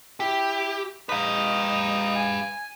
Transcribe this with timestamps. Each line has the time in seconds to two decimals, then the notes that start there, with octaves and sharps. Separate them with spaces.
0.20 E4 G4
1.09 D#4 B4 F5
2.15 G#5